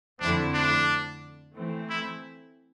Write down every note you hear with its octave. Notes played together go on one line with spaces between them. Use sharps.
F2 D3 A3 C4 D4 E4
D4
E3 A3 C4
E4